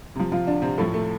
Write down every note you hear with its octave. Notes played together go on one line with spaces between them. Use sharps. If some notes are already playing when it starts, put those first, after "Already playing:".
C3 F3
F3 F4
D3 D4
C3 C4
A2 F3 A3
A3